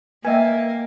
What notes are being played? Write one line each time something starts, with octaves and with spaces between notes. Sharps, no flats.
A#3 B4 D#5 E5 G5 G#5